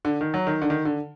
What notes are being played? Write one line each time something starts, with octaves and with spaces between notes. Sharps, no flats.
D3
D#3
F#3
D#3
D3
D#3
D3